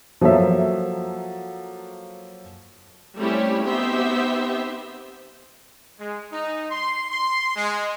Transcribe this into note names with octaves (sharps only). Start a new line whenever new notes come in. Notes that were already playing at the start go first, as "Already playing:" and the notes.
F3 F#3 A#3 A4 C#5 E5
G3 A3 C4 C#4 E4 G4
B3 C4 D#4 G4 C5 E5
G#3
D#4
C6
C6
G#3